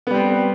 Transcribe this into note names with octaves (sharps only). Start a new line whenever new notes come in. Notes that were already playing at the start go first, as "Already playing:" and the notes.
G3 B3 C4